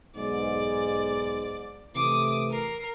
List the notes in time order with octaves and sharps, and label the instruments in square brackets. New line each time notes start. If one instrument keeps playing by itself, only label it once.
[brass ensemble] B1 G#2 [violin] D5
[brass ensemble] C3 E3 A3 [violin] D6 D#6
[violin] A#4 C7